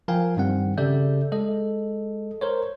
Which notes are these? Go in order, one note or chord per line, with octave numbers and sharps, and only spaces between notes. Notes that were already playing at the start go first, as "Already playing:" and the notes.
F3 A#4 F5 G5 G#5
G2 D#3 G3 C4 F#5
C#3 G4 A4 D5 E5 G6
G#3 A4 D#5
A#4 C5 C#5